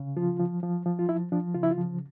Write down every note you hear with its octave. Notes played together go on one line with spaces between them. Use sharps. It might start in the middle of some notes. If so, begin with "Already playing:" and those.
Already playing: C#3
F3 F4
F3
F3
F3
F4
F3 E4
F3 D4
C#3 F4
E4
F4
F3